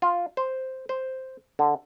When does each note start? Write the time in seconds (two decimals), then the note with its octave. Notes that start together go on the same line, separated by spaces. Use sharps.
0.02 F4
0.37 C5
0.89 C5
1.59 D3